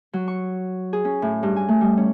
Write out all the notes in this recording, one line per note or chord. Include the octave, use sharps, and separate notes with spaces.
F#3
C#6
G#4
C#4
A2
G2
G#5
A3
G3
C#4